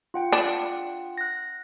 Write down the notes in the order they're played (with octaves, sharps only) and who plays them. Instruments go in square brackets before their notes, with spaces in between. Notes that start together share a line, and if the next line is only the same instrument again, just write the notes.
[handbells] F4 F#5 G5
[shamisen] D4
[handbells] F#6 A#6